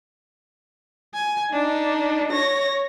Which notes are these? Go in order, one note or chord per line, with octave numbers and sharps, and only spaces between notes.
G#5
D4 D#4
C#5 A#6